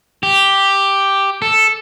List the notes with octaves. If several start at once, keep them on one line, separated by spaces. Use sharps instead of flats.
G4
A4